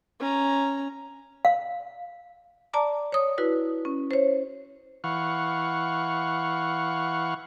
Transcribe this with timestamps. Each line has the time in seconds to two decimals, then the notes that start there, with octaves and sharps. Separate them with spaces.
0.20 C#4 A#5
1.45 F5
2.73 D5 A5 A#5 D6
3.12 C#5 D#6
3.38 E4 F#4 B4
3.85 C#4
4.11 C5 C#5
5.04 E3 F5 F#5 C#6